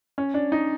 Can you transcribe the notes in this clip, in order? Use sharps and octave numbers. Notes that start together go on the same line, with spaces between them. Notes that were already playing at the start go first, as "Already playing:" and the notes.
C#4
D4
D#4